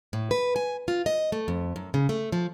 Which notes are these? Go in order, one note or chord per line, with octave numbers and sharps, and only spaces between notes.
A2
B4
G#5
F4
D#5
A3
F2
F#2
C#3
A3
F3